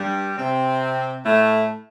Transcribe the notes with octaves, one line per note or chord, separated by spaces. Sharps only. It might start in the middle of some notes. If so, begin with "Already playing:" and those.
Already playing: G2 G3
C3 C4
A2 A3